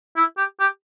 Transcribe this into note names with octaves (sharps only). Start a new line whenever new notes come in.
E4
G4
G4